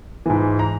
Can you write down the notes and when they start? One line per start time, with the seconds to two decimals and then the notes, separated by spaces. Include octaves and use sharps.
0.26 G#2 E3
0.59 A#5